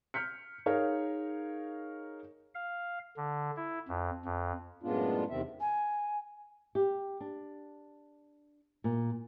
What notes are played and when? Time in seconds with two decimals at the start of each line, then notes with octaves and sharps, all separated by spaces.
0.14 F6 G6 B6 C#7
0.66 D#4 G#4 A#4 C#5 F5
2.55 F5
3.17 D3
3.57 E4
3.88 F2
4.25 F2
4.83 F#2 A2 G#3 B3 D4 F4
5.30 E2 C3 D#3 C4 E5
5.61 G#5
6.75 G4
7.20 D4
8.84 A#2